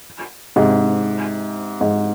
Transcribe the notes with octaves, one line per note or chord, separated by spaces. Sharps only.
G#2 C3
G#2